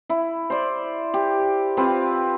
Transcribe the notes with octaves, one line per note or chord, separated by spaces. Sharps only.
E4
C5 D5
G4
C4 F4 B4